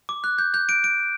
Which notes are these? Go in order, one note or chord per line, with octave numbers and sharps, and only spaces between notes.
D6
F#6
G6
G6
D7
D7